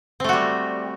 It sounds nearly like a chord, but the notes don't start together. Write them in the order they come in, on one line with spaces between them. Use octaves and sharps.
C4 A3 F#4 G3